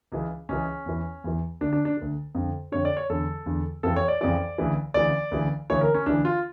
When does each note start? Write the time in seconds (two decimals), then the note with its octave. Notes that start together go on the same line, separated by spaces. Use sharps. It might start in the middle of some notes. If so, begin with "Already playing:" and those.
0.12 C#2 C#3 E3
0.49 C#2 C#3 E3 C#4
0.86 E2 E3
1.24 E2 E3
1.61 D2 D3 D4
1.73 D4
1.85 D4
1.97 D2 D3
2.35 F2 D3
2.72 F2 D3 C#5
2.85 D5
2.97 C#5
3.09 E2 D3 A4
3.46 E2 D3
3.83 F2 C#3 E3 A4
3.96 C#5
4.08 D5
4.21 F2 C#3 E3 D5
4.58 D2 C#3 E3
4.94 D2 C#3 E3 D5
5.31 D2 C#3 E3
5.70 D2 C#3 E3 C#5
5.81 A#4
5.94 C#4
6.06 D2 C#3 E3 D4
6.25 F4